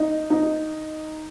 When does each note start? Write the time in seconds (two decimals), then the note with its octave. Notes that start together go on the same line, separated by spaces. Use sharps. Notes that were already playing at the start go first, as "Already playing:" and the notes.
Already playing: D#4
0.30 D#4